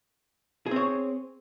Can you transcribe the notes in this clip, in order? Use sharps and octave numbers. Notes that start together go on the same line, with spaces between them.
C4 G#4 C#5